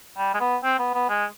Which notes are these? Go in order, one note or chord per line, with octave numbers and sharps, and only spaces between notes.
G3
G#3
B3
C4
B3
B3
G#3